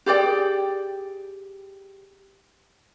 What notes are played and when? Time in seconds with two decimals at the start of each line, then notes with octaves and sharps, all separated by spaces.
0.06 G4 G#4 D5 G5